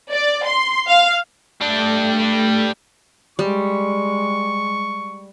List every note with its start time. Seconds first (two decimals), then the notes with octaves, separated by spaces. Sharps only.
0.10 D5
0.46 C6
0.87 F5
1.61 G3 A3 D4
3.39 G3 G#3 C#6